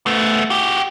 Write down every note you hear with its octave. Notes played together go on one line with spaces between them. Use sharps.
A3 B3
F#4 G4